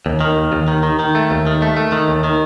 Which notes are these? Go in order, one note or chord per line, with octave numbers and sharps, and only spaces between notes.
D#2
D#3
D#2
D#2
D#3
D#3
D#3
A3
D#2
D#3
A3
A3
D#3
D#2
D#3